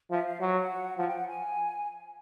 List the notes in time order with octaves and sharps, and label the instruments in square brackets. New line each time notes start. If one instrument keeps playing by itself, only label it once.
[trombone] F3 [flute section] E5
[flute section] F5
[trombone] F#3 [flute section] F#5
[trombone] F3 [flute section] F#5
[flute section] G5
F#5
G#5